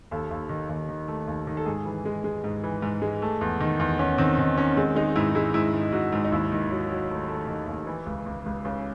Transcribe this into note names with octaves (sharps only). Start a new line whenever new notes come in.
D#2 A4
D#2
D#3
D#2
D#3
A3
D#2
D#3
A4
G#2 G#4
E3
G#3
G#3
G#2
E3
G#2
G#3
A3
E2
D#3
E2
E2 C#4
D#3 C4
D#3 C4
D#3 C#4
G#3 C4
G#3 D#4
G#2 E4
G#3 E4
G#2 E4
G#2
G#2 F#4
G#2
D#4
D#2 E4
D#3
F#3
F#3
A3
A3
D#3
D#2
E3
C#2
C#2
C#2
C#2 C#4